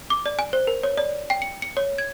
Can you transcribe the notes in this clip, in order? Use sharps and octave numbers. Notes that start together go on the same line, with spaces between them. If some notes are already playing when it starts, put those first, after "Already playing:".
D6
D5
G#5
C5
A#4
C#5
D5
G5
C#7
C#7
C#5
G#6